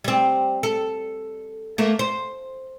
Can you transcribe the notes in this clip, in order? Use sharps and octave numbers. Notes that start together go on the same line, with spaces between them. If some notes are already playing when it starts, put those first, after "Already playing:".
G3 C4
A4
A3 A#3
C5